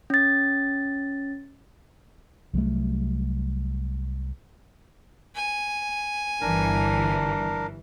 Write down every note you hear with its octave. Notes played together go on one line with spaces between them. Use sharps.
C#4 A6
C2 F#3 G3 A3
G#5
G1 E3 D4 A#4